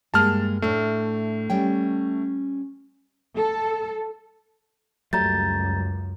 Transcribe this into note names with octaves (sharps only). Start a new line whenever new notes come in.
G2 G#3 A#3 A5 F6
A2 A3 D4
G3 C#4 G5
A4
C#2 F#2 F#3 G3 A3 A#5 G6 A6